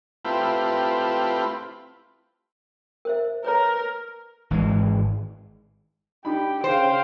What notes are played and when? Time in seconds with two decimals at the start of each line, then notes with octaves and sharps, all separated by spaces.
0.25 A3 C4 E4 F4 G4 B4
3.05 A#4 C5 E5
3.44 A#4 B4 C#5 A#5
4.51 G#1 G#2 E3 G#3
6.25 D4 D#4 G4 B5
6.64 C#3 C5 F5 G5